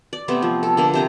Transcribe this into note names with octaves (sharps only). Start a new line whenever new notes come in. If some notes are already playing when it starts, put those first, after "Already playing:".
D5
C3 A3 B3 C5
F3
A4
D3 A#3 B4
C3 C5 A#5